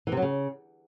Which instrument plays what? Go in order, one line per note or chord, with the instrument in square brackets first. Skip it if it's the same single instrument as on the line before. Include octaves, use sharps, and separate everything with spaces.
[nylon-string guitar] E3
C3
F#3
C#3